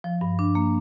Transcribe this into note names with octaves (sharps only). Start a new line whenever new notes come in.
F3
G2
D4
A#3